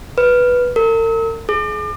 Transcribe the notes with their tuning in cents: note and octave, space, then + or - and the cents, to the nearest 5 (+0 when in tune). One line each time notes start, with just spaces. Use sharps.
B4 -5
A#4 -45
G#4 +35